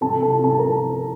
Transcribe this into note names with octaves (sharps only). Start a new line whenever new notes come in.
C2 A4 A5
C2 A4 A5
C2 A4 A5
A#4 A#5